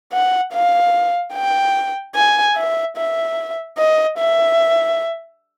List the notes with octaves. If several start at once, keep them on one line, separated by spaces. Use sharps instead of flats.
F#5
F5
G5
G#5
E5
E5
D#5
E5